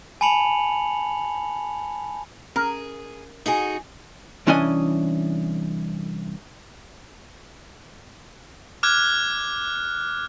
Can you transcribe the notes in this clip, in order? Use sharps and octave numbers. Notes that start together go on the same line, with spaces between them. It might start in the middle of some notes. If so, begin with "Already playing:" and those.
G#5 A5 B5 C#7 F7 F#7
C#4 G#4 A#4
D#4 F#4 G#4 F#5 G#5
C2 E3 C#4 D4 D#5 G#5
D6 F6 F#6 G#6